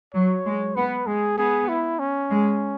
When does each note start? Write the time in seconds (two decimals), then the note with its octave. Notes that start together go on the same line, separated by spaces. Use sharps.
0.14 F#3 C#5
0.45 G#3
0.75 B3 B4
1.07 G#3 G#4
1.38 B3 G#4
1.68 E4
1.99 C#4
2.30 G#3